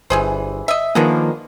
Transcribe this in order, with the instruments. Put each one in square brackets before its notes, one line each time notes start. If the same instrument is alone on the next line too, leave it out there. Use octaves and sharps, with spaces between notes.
[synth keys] G1 [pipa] E3 G#4 C5
[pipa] D#5 E5
[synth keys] D#3 F3 A#3 [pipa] G#3 B3 D4